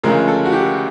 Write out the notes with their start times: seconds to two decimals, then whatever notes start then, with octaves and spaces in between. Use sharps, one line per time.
0.03 D2 C#3 F3 G#3 A#4
0.28 A4
0.45 F#4
0.52 G4